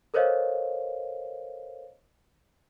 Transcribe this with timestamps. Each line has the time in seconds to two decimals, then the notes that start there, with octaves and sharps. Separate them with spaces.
0.14 A4 A#4 C5 C#5 D#5 F5